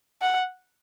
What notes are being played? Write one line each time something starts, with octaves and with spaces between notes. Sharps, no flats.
F#5